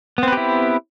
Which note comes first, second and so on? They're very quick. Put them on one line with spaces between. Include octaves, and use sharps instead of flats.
B3 C4 B4 G4 E4